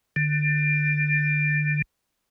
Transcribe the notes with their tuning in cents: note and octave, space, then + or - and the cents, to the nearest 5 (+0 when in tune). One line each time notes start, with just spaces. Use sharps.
D3 +25